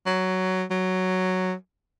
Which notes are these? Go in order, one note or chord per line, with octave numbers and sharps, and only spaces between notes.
F#3
F#3